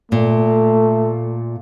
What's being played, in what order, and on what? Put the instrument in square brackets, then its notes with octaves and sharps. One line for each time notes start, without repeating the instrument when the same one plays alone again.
[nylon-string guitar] A#2 [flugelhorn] A3